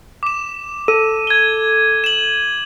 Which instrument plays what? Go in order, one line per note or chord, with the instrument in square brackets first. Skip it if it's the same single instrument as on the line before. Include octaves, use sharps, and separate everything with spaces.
[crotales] D6 E7
[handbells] A4 [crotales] D#7
[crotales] G#6 G7
E7 F#7